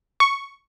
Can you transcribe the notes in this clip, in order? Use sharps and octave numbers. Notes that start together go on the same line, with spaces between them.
C#6